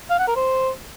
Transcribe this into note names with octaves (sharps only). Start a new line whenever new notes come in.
F5
F#5
A#4
C5